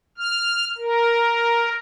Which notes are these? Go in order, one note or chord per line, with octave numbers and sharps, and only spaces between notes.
F6
A#4